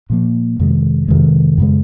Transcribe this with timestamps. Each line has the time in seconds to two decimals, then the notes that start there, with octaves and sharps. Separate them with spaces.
0.10 A#2 F3 A#3
0.59 F2 C3 D#3 G#3
1.08 F2 C3 D#3 G#3
1.58 F#2 C#3 G#3